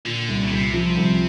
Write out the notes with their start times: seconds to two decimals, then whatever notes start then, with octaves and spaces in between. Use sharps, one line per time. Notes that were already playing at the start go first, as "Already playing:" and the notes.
0.05 A#2 D3
0.28 C2
0.41 C#3
0.51 C2 C3
0.73 F3
0.97 C2